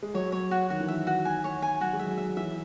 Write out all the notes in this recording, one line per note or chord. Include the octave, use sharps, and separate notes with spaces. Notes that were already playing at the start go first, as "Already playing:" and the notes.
G#3
F#3 C#5
C#5
F#4
D#3 F#4
E3
D#3 E5
F#4
G#5
C#5
G#5
F#3 F#4
G#3
E5
F#3
E5
E3 E5